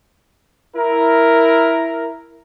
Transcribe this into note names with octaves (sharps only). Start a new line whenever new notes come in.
E4 A#4